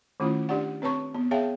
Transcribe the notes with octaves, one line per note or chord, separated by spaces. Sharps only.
D#3 A3 C#4 E4 F4
D4 G4 D5 F#5
C4 B4 C#5 A5 C#6
B3
G#4 C#5 E5 F5 G5 A5